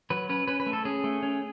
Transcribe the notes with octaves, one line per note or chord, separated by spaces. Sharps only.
F#3 B4
C#4 B4
C#4 B4
B4
A3
A4
C#4 G#4
A3
C#4